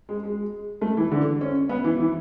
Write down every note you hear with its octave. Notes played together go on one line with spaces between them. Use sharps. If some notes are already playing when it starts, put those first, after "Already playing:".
G#3
G#3
A3
E3
D3
C#4
B3
E3
E3